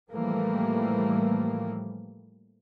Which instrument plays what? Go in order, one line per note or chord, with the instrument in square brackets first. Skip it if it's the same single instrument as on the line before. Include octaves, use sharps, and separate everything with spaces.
[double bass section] A2 E3 F3 G3 A3 A#3